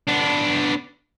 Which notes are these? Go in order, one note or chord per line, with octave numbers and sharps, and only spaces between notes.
B3 D4